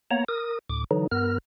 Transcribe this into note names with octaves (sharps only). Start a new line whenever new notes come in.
A#3 B3 C#5 A#5
A#4 D#6
D2 A2 D6
D3 E3 F#3 D#4
G2 B3 A#4 F6